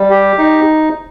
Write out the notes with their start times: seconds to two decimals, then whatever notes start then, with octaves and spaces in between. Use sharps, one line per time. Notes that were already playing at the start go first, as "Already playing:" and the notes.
Already playing: G3
0.10 G4
0.38 D#4